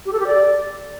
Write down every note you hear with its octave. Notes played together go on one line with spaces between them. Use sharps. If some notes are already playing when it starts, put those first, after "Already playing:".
G4
A4
G4
D5